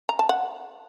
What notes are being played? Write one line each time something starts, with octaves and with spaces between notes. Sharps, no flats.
A#5
A5
F#5